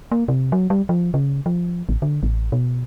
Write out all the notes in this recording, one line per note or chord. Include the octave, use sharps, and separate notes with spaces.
A#3
C3
F#3
G3
F3
C#3
F3
A1
D3
A1
B2